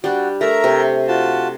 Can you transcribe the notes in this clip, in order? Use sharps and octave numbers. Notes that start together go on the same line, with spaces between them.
G3 D4 F#4
A3 A#4 E5 A#5
C3
F4 F#4 A5